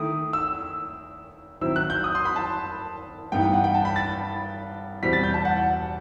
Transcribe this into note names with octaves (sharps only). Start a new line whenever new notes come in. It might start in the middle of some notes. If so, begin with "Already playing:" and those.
Already playing: D#3 A3 E4 D#6
E6
D#3 F#3 C4 E4 E6
F#6
G6
D#6
C6
B5
A5
G2 E3 B3 D#4 G5
G5
F#5
G5
A5
B5
A6
E2 B2 G3 C4 B6
A6
G6
A5
F#5